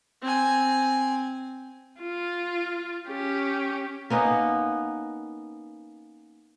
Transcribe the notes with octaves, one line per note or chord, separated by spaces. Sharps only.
C4 G#5
F4
C#4 G4
A#3 B3 C#4 D#4